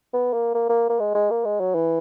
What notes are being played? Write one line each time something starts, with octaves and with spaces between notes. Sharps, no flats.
B3
A#3
A#3
A#3
A#3
G#3
G#3
A#3
G#3
F#3
E3